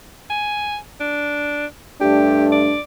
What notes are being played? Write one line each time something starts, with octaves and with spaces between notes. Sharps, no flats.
G#5
D4
G2 A3 D4 G4
D5